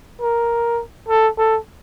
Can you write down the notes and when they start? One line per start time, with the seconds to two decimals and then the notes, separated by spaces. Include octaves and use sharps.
0.21 A#4
1.09 A4
1.37 A4